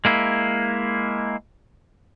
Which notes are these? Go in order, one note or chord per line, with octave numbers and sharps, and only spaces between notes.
G#3 A#3 E4